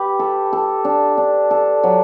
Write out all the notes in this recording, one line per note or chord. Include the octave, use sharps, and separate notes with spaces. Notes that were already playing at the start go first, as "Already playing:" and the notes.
Already playing: G4 B4
A4
A4
D4
D4
A4
F#3